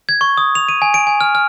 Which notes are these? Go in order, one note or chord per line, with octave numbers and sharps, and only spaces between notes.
G#6
C#6
D#6
F7
D#7
G#5
D7
G#5
F6
F6